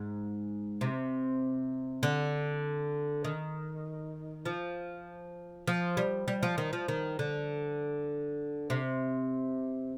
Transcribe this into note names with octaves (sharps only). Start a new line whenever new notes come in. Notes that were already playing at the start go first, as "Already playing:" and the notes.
Already playing: G#2
C3
D3
D#3
F3
F3
G3
G3
F3
D#3
F3
D#3
D3
C3